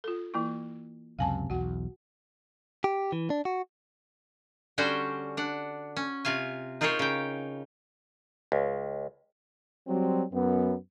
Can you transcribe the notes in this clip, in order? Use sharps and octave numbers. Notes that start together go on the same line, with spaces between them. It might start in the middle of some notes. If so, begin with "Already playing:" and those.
F4 A4
E3 A#3 E4
C#2 F#2 C3 F5 G#5 A5
B1 E2 F#4 F#5
G4
E3
D4
F#4
D3 G3 C#4 F#4 C5
D4 F#5
C#4
C3 F4 F5 G#5
D#4 F4 G#4 A#4 C5 C#5
C#3 G5
C#2
F#3 G3 C4
F#2 B3